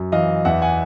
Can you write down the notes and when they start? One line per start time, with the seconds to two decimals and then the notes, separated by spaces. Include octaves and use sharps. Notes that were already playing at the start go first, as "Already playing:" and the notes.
Already playing: F#2
0.12 E3 D#5 F5
0.45 E2 E5 F#5
0.62 F#5 G#5